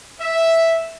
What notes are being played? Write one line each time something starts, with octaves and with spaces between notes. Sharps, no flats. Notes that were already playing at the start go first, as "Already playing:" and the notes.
E5